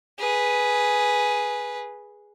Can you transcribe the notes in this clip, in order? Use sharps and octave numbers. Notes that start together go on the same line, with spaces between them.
G#4 B4